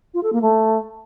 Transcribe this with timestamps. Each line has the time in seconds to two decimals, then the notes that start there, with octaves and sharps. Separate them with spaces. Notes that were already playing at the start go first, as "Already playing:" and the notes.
0.14 F4
0.23 A4
0.33 A#3
0.42 A3